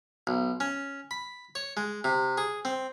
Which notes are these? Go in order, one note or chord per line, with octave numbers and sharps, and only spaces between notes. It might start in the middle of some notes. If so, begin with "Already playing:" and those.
B1
C#4
B5
C#5
G#3
C3
G#4
C4